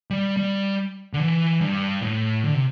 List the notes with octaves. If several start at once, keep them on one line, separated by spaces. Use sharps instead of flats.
G3
G3
D3
E3
G2
A2
D3
C3